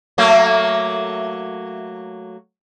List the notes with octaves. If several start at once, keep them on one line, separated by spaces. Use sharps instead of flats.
F#3 A3 A#3